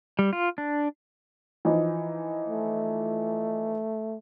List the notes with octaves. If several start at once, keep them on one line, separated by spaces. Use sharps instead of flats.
G3
F4
D4
E3 F3 D#4
A3